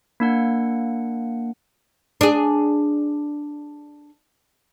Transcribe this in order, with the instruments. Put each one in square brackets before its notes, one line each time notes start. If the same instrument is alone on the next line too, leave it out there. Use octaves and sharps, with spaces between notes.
[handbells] A#3 D4 F#5
[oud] D4 G#4